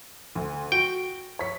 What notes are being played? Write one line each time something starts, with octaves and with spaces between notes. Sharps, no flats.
D2
F#4 G5
C#5 B6